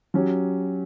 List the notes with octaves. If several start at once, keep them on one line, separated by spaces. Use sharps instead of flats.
F#3 C#4 G4